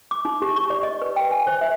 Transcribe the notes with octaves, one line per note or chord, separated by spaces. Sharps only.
D6
D#4
G4
C#6
D5
D#5
B4
G5
G#5
C5
E5